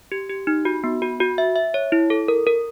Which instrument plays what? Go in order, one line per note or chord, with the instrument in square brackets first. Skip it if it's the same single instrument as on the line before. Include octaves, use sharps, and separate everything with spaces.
[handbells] G4
G4
D#4
F#4
B3
F#4
F#4
E5
E5
C#5
E4
A4
A#4
A#4